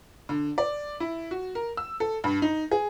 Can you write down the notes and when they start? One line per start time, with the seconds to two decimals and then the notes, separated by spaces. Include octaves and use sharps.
0.29 D3
0.58 D5
1.00 E4
1.31 F#4
1.55 A#4
1.77 E6
2.00 A4
2.24 G2
2.42 D#4
2.71 G#4